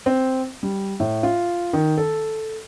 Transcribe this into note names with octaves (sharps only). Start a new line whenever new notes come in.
C4
G3
A2
F4
D#3
A4